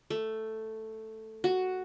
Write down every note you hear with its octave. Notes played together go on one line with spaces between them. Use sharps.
A3
F#4